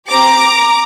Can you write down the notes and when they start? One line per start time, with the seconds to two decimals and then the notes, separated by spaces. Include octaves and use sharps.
0.09 C4 G4 A#5 D6